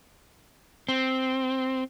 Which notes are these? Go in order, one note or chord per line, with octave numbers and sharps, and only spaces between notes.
C4